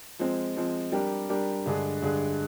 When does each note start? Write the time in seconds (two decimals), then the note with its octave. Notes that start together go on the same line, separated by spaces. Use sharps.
0.19 F3 G#3 C4
0.56 F3 G#3 C4
0.92 G3 D4 G4 A#4
1.29 G3 D4 G4 A#4
1.66 G2 D3 G#3 D4 G#4
2.02 G2 D3 G#3 D4 G#4